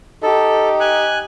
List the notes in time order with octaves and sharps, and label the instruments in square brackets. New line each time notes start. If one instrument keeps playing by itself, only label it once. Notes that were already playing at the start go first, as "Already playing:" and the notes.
[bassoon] D#4 [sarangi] G4 [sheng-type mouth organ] A4
[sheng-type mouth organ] G#5 F#6